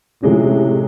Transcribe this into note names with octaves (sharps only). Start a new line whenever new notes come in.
A2 C3 F3 G#3 C#4